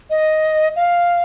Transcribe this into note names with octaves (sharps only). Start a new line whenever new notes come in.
D#5
F5